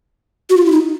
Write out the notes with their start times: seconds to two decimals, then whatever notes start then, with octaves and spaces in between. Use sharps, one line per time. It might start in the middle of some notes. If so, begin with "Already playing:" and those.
0.50 F#4
0.57 F4
0.66 E4
0.72 D#4